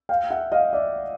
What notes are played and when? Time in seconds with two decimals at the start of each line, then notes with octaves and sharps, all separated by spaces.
0.09 F5 G5
0.30 E5 F#5
0.52 D#5 F5
0.73 D5 E5